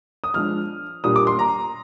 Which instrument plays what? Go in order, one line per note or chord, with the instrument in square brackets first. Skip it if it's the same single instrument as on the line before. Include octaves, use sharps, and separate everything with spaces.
[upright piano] D#6
F3 G#3 D4 F6
A#2 G3 D4 D#6
D6
C6
A#5